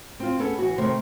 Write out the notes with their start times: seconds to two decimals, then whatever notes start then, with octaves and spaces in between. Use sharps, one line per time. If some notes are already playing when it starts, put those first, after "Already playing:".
0.20 C4 F4
0.39 B3 C#4 G#4 A4
0.58 E3 F#4
0.78 C3 D#3 A3 C5